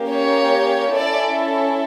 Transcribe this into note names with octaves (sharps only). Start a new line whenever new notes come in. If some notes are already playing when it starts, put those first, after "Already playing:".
Already playing: A#3 C#4 G4
C#5
C#4 E4 A4 D5